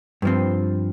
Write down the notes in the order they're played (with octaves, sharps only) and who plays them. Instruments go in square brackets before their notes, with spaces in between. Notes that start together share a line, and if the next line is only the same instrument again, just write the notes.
[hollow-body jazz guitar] G2 F3 C4